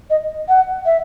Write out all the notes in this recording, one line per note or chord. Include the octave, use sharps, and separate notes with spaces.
D#5
F#5
E5